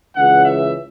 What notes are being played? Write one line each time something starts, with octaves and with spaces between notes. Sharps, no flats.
C#2 C#3 E3 F#5
E5